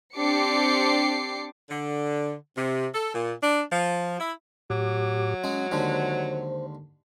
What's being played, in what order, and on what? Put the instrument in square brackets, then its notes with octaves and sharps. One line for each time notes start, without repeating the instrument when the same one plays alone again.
[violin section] C4 D4 G4 D6 C7 C#7
[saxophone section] D3
C3
A4
A#2
D4
F3
E4
[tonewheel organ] A2 G4 D6 [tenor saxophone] F#3
[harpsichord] G#3 G#4 [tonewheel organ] C#4
[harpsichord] D#2 D3 G#3 [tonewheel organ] C5